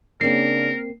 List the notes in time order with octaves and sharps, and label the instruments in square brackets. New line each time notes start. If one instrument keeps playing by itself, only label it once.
[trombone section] C#3 D4 [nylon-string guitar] A#3 C4 [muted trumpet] A#4 [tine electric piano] C7